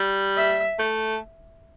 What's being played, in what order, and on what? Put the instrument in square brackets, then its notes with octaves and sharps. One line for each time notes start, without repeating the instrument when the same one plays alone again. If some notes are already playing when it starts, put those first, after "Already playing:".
Already playing: [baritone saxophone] G3
[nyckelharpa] E5
[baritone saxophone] A3